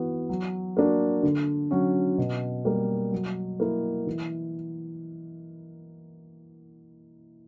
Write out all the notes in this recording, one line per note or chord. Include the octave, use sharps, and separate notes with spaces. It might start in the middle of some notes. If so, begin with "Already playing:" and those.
Already playing: E3 B3 F#4
F#3
A#3 D4 F#4
D3
F#3 C#4 F#4
B2
G3 A#3
F#3
A#3 E4
E3